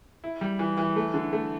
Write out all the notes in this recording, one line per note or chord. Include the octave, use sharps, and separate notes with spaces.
E4
G3
E3
E3
A3
D3
A3